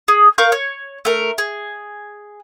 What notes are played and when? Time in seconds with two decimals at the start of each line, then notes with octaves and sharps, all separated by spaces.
0.08 G#4
0.38 A#4 F5 C#6 G6
0.52 C#5
1.05 A3 A#4
1.38 G#4